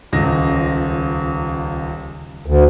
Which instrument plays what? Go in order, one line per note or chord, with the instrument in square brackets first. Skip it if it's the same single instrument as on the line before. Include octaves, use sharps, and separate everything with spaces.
[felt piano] D#1 C#2 A#6
[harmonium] D2